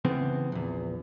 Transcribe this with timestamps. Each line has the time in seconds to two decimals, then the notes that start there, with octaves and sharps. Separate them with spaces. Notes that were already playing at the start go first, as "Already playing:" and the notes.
0.05 C#3 E3 B3 C4
0.52 A#1 E2